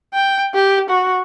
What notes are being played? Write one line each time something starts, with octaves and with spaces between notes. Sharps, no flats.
G5
G4
F#4